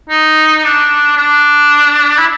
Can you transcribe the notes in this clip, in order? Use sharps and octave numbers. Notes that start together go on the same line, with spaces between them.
D#4
D4
D4
E4